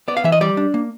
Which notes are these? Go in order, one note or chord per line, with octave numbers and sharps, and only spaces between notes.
B3 D5
F5
E3 E5
D#5
G3 D5
D4
A#3